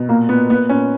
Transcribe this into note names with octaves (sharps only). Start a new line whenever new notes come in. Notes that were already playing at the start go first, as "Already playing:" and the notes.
Already playing: B2
A#2 A#3
A#2 B3
A#2 B3
A#2 C#4